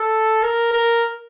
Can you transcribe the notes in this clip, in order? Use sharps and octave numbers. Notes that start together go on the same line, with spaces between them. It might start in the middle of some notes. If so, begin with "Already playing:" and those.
Already playing: A4
A#4
A#4